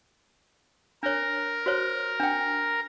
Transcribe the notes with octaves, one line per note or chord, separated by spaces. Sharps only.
D4 A#4 C#5
F#4 C5 C#5
D4 G5